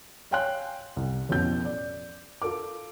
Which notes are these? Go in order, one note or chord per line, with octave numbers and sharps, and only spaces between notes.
C#5 F5 G5 G#5 C6 F#6
C2
A1 F2 B2 G6
D5
F4 A4 A#4 D6